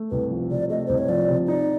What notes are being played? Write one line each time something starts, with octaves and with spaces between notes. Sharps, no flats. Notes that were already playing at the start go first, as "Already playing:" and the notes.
Already playing: A3
C2 B4
F3
C3 D5
A3 D#5
C2 C5
C#5
F3 D5
C3
D#4 D5